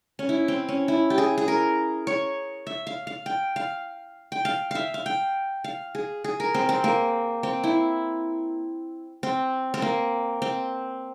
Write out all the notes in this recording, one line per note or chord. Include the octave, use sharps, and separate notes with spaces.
C#4
E4
C4
C#4
E4
G4
G#4
G#4
A#4
C#5
E5
F5
F5
G5
F5
G5
F5
E5 F5
F5
G5
F5
G#4
G#4
A#4
C4
C4
A#3
C4
E4
C4
C4
A#3
C4